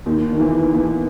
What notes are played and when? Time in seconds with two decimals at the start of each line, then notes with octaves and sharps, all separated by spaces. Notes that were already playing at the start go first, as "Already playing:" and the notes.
0.06 D#2 D#3
0.33 D#3
0.40 E2 E3
0.73 E2 E3